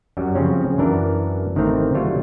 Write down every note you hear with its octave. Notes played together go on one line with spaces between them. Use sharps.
F#2 F#3 G3
C#3 F3 C4 C#4
F#2 E3 D4 A#4
A1 D#3 E3 A3 C4 A#5
F#3 G3 A3 F4 C#5